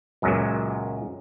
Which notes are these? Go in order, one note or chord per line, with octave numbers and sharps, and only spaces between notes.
C#2 F#2 A#2 F#3 G#3 B3